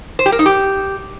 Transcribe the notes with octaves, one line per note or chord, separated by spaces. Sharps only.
C5
G4
A#4
D#4
G4